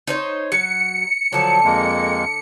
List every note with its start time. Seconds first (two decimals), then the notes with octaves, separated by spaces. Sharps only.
0.07 D#4 C5 C#5
0.52 F#3 C#7
1.33 D3 F3 F#3 A5
1.65 F2 G#3 A#3